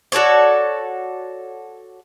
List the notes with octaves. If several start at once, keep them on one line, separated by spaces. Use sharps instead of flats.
F#4 A4 C#5 D5